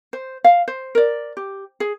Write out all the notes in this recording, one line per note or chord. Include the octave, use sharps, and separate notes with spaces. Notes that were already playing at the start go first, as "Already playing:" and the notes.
C5
F5
C5
A#4 D5
G4
G#4